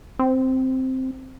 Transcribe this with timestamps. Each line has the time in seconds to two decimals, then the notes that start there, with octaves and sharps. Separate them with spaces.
0.19 C4